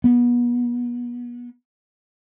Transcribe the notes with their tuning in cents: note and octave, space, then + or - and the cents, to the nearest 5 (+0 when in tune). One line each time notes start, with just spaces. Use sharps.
B3 -35